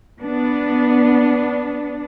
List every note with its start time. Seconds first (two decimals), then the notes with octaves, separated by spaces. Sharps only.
0.21 B3 D4